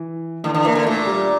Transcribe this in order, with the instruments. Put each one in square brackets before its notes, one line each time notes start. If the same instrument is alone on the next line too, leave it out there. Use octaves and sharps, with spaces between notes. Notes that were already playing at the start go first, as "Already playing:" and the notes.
Already playing: [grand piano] E3
[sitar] D3 [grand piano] E3
[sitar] D3
[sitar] E3 [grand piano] A#3
[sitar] D3
[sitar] A#2 [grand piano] A3
[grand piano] G3